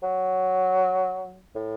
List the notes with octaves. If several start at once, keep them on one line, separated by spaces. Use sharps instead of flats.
F#3
A2